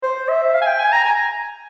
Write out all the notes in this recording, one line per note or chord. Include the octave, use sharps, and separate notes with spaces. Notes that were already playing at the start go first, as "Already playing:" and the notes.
C5
E5
F5
G#5
G5
G#5
A#5
G#5